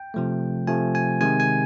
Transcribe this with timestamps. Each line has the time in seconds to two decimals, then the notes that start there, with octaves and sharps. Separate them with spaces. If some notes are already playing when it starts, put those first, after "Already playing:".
Already playing: G5
0.14 C3 F3 A3
0.67 C3 F3 A3 G#5
0.95 G#5
1.21 C3 D#3 G#3 G#5
1.40 G#5